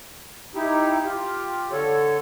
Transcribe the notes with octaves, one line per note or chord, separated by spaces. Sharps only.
D#4 E4 G4
F4 G4
D3 A4 C#5